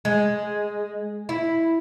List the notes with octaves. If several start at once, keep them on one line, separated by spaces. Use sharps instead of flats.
G#3
E4